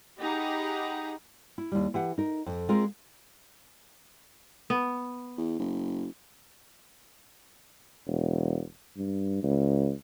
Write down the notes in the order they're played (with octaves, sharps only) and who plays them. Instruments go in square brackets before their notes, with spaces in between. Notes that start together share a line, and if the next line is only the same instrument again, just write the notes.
[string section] D#4 G4 G#4 F#5 A#5 B5
[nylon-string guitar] E4
D#2 G3
E3 G4 F#5
D#4 A#4
F2
G#3 C4 F4 A#4
[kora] B3
[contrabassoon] E2
F#1
[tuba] E1
G2
C#2